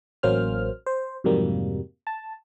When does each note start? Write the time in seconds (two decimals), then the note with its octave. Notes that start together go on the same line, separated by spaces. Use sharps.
0.23 A1 F#3 A#3 C#4 C5 F6
0.86 C5
1.24 F2 G#2 C3 F#3 G3 A#3
2.07 A5